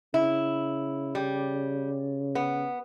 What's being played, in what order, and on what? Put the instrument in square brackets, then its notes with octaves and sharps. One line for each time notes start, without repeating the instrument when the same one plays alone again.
[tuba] C#3 [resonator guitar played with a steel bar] E4
[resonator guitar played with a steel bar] G3
B3